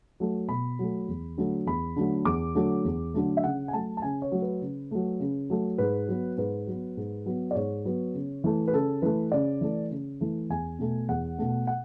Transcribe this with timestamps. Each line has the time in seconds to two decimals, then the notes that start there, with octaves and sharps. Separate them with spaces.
0.20 F#3 A3
0.49 B2 B5
0.79 F#3 A3
1.08 E2
1.37 D3 F#3 A3
1.66 E2 B5
1.96 D3 F#3 A3
2.25 E2 D6
2.55 D3 F#3 A3
2.85 E2
3.14 D3 F#3 A3
3.37 E5
3.43 C#3 F#5
3.68 G#5
3.73 F#3 A3 A5
3.97 A5
4.02 C#3 G#5
4.22 C#5
4.32 F#3 A3
4.42 B4
4.61 C#3
4.91 F#3 A3
5.20 C#3
5.50 F#3 A3
5.78 G#2 B4
6.08 F#3 B3
6.37 G#2 B4
6.67 F#3 B3
6.97 G#2
7.26 F#3 B3
7.51 D5
7.55 G#2 C#5
7.85 F#3 B3
8.14 C#3
8.44 E3 A3
8.68 B4
8.73 C#3 A4
9.02 E3 A3 B4
9.32 C#3 D5
9.61 E3 A3
9.90 C#3
10.21 E3 A3
10.50 E2 G#5
10.79 B2 A3
11.09 E2 F#5
11.39 B2 A3
11.67 F#5